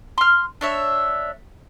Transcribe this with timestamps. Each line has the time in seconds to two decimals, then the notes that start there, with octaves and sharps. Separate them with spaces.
0.18 C6 F6
0.61 D4 C#5 E5